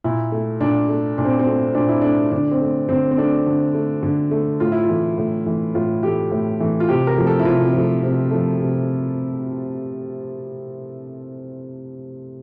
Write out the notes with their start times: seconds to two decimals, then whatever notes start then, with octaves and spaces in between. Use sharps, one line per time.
0.04 A#2 E4
0.32 A3
0.61 A#2 D4
0.89 A3
1.18 A#2 D4
1.25 C4
1.39 C4
1.47 A3
1.75 A#2 D4
1.88 E4
2.02 A3 D4
2.32 D3 D4
2.51 C4
2.61 A3
2.89 D3 C4
3.11 C4
3.18 A3 D4
3.46 D3
3.75 A3
4.03 D3
4.31 A3
4.60 A2 F4
4.72 E4
4.83 F4
4.89 E3 A3
5.18 A2
5.46 E3 A3
5.75 A2 F4
6.02 E3 A3 G4
6.31 A2
6.60 E3 A3
6.80 F4
6.88 C3 G4
7.07 A#4
7.17 F3 A3
7.27 A4
7.40 E4
7.45 C3 F4
7.73 F3 A3
8.03 C3
8.31 F3 A3
8.59 C3